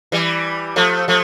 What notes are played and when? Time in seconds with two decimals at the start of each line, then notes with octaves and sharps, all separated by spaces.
0.12 E3 G3
0.76 F3 A3
1.08 F3 A3